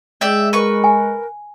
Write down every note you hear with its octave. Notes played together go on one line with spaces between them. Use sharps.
G#3 D5 E5 G5
A#4 B4 C#6
G#5